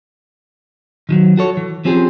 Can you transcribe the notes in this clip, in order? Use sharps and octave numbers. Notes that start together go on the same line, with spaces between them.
D#3 F3 F#3
F#4 A4 C#5
E3
F3 C4 C#4 G4 G#4